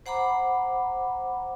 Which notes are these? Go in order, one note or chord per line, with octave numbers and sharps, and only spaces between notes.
C5 F#5 A#5 B5 D6